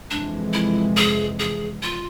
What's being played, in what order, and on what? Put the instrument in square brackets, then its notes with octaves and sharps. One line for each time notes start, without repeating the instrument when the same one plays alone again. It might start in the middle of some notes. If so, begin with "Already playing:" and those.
[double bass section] F2 C3 E3 G#3 [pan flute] D4
[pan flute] E4
G#4
G#4
F4